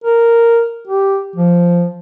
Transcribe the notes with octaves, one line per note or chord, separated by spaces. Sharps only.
A#4
G4
F3